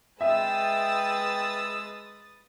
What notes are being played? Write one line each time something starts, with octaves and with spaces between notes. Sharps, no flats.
G#3 B4 E5 G5 D#6 E6 A6